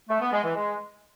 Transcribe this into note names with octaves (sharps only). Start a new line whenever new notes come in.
A3
B3
G#3
E3
G#3